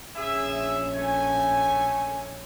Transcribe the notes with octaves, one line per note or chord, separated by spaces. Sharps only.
A#1 C#4 G#4 E5
A3 G#5